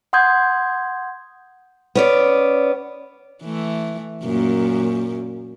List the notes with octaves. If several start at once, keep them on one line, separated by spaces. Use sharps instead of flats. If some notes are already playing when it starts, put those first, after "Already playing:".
F#5 C6 D#6 G6 G#6
B3 C#4 D5
E3 A3
F#2 A#2